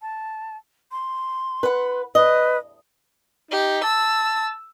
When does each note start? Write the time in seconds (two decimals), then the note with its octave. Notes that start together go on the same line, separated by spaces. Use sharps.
0.02 A5
0.92 C6
1.63 B4 F#5
2.15 B4 D#5
3.51 D#4 G4
3.84 A5 E6